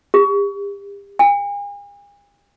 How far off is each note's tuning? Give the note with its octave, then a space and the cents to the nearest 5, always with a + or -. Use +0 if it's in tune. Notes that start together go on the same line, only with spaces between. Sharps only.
G4 +40
G#5 -45